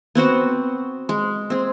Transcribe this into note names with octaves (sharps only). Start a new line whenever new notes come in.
B3 C4 F#4 C5
G#3
C4 G#4